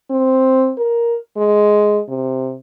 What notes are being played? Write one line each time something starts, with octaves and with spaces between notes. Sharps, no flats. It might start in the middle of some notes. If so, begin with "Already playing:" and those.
C4
A#4
G#3
C3